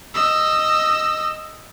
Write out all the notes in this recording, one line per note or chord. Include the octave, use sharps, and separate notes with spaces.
D#5 E6